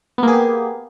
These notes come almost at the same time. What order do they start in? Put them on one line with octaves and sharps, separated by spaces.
B3 A#3 G#4 G4